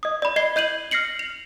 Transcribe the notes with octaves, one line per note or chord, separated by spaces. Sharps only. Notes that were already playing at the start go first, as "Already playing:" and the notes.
D#5 D#6
D5 B5
D#5 C7 G7
D#5 G6 D#7 F#7
F6 A#6 C7 C#7 F#7
F7